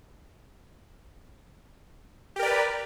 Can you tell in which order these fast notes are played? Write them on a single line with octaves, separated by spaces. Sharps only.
G4 A#4 D5 B4